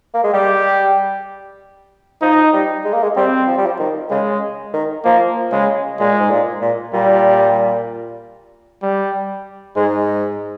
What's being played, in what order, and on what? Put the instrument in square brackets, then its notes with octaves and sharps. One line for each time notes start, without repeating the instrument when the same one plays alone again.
[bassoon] A#3
G#3
[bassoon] G3 [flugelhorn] G4
[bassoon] F3 [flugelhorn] D#4
[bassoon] G3
G#3
A#3
G#3
[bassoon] G3 [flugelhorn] C4
[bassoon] F3
G3
F3
D#3
[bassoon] C#3 [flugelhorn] G#3
[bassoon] D#3
[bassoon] F3 [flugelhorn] A#3
[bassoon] C#3 [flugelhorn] G#3
[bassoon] A#2 [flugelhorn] G#3
[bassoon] G#2
A#2
A#2
[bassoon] A#2 [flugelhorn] G3
[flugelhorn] G3
[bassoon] G#2 [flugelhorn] G#3